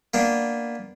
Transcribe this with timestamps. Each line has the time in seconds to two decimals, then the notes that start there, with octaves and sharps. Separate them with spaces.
0.14 A#3 B3 D4